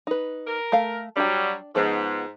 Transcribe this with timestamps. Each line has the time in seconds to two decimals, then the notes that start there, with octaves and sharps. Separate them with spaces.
0.07 D#4 B4
0.47 A#4
0.72 A3 F5
1.17 F#3 G3 D4 G5
1.75 G#2 F3 B3 C5